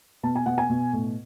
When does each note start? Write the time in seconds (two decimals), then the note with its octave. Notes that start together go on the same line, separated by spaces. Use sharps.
0.23 B2 A5
0.36 G#5
0.46 B2 F#5
0.58 G#5
0.70 B2
0.93 A2